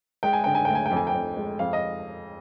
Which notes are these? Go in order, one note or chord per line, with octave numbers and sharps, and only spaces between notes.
G#3 G5
G#5
D3 G5
G#5
D2 G5
G#5
G5
F2
G#5
G5
F2
G#3
F2 F5
D#5